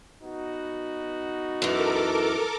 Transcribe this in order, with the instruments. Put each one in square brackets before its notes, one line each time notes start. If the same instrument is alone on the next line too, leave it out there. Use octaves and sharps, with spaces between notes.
[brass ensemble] B3 D#4 F#4
[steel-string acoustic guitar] F#2 E3 [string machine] A4 A#4 D6